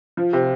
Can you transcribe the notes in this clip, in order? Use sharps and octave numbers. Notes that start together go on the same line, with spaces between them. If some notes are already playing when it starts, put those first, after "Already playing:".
F3
C3